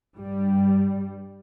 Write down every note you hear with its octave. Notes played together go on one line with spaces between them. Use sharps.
G2 G3